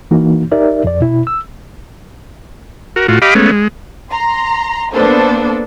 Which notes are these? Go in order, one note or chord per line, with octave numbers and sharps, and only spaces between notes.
E3 A#3 D#4 F#4
D#4 G4 A#4 D5 E5
F2 D5
B2 E4
E6
F#4 A#4
A2 F4 F#4
G4 D#5 F5 B5 D6
G#3 A3 B3 C#4
G#3
A#5 C6
A#3 B3 D4 A4 B4 C5